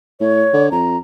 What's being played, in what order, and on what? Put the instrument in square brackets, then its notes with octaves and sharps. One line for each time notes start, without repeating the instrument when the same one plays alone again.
[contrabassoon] A2 [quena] C#5
[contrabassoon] D3
[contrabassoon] F2 [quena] A#5